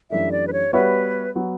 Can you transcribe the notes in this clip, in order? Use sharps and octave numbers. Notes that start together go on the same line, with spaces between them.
F#2 E3 A3 D4 G4 E5
D5
B4
C#5
G3 B3 F#4 B4 C#5 E5
F#3 B3 F#4